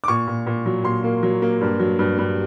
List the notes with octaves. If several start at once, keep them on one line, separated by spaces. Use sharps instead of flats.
D6
A#2 C#6
A#2
A#2
F#3
A#2 C6
A#3
F#3
A#3
G2
F#3
G2
G2